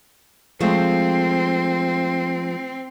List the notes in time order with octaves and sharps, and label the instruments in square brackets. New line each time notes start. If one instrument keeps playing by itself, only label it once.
[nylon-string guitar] F3 G#3 A3 [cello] C4